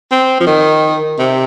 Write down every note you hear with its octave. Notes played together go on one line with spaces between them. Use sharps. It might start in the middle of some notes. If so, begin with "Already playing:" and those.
C4
F3
D#3
C3